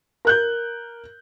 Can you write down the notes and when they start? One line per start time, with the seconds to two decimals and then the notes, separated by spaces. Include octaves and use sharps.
0.25 A#4 F#6 G6